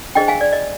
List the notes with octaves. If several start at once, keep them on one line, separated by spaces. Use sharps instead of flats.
D4 G#4 C5 D#5 G5
F5 G#5
D5
D#5